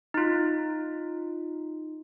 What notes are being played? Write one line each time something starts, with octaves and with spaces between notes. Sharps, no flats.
D#4 F4